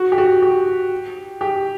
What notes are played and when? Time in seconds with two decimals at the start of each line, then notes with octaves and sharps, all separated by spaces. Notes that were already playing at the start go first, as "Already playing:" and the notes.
Already playing: F#4
0.12 G4
0.18 F#4
0.42 G4
1.41 G4